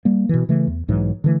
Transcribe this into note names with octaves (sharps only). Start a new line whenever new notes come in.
G3 A#3
B2 E3
C#3 E3 A3
E2
B1 G#2 E3 F#3
D3 E3 A3